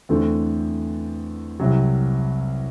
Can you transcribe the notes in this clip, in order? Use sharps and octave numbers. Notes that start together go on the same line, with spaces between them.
E2 D3 A3 C4
C2 C3 F#3